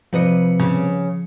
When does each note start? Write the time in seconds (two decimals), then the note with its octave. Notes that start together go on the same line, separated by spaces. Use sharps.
0.13 C3 F3 B4 D#5 C#7
0.60 C#3